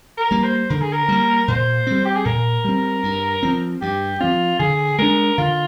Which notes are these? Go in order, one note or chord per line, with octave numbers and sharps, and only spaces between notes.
A#4
G3 A#3
C5
D3 A#4
G#4
A#4
G3 A#3
A#2 C5
G3 C4
G4
G#4
A#2 A#4
G3 C4
G2
F3 C4
G2 G4
F3 C4 F4
D3 G#4
G#3 D4 A#4
D3 F4